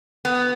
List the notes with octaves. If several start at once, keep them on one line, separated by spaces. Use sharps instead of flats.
B3 F#4